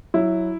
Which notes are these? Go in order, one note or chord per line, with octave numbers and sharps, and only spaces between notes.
F#3 E4